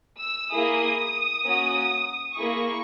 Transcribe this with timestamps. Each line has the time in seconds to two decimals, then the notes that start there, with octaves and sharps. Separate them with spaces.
0.20 E6
0.51 A#3 E4 G#4 D#6
1.44 A#3 C#4 F#4
2.37 A#3 E4 G#4 C#6